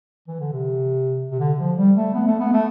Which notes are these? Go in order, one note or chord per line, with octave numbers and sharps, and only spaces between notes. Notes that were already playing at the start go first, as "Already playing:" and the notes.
E3
D3
C3
C3
D3
F3
G3
A3
B3
A3
B3
A3